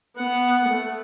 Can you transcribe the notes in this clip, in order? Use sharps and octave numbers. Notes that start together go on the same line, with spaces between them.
B3 F#5
A3